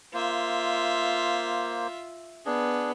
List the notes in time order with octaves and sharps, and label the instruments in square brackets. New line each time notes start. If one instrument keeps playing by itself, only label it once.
[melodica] A#3 C5 [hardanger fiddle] F4 E5
[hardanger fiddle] B3 [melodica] D4 G#4